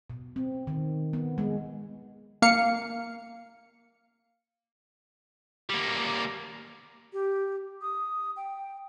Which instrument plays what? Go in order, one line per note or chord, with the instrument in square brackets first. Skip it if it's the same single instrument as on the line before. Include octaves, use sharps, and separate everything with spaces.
[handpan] B2
C4
D#3
B3
G#3
[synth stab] A#3 F5 C#7
[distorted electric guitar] G3 A#3
[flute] G4
D#6
G5